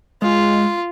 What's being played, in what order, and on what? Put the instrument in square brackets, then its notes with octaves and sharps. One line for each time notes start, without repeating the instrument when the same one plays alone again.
[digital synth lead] G#3 [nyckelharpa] F4